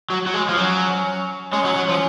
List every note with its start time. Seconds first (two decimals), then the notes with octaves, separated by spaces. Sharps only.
0.10 F#3
0.26 F#3
0.34 G#3
0.49 F3
0.57 F#3 C#4
1.52 G#3 C#4
1.65 F#3
1.76 F#3
1.89 F3